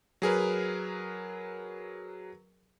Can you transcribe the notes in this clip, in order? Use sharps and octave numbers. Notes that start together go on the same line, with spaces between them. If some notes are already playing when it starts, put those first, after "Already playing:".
F#3 G#4 A#4 B4